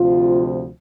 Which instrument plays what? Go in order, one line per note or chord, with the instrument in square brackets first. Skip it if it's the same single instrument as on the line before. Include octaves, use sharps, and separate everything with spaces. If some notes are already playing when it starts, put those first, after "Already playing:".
Already playing: [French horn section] D2 C3 F3 F4